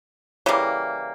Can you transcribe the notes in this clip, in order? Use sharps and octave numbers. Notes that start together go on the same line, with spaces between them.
C#3 E3 G3 A#3